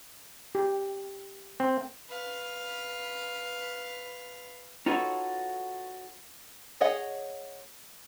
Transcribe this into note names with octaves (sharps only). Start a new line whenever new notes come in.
G4
C4
B4 F5
D#4 F4 F#4 A4 B4 C#5
G#4 C#5 D#5 F#5